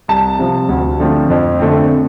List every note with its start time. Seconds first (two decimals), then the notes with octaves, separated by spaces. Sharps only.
0.08 C2 A5
0.39 C3 F3
0.69 D2
1.00 D3 F3 A3 C4
1.30 F2
1.59 D3 A3 C4